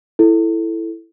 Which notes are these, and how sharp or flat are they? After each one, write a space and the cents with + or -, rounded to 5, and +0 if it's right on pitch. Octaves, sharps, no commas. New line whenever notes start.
E4 +5 A4 +0